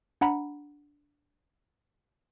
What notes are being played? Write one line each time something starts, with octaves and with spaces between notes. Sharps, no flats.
D4 F#5 A#5 B5